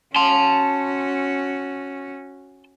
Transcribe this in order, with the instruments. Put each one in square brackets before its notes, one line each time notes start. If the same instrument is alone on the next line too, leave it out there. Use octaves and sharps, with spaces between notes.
[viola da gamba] C#4 F#4 [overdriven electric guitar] A5 C6